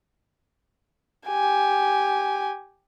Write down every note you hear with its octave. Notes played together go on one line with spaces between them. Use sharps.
G4 G#5